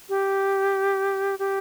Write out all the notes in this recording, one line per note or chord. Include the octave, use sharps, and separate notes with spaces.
G4
G4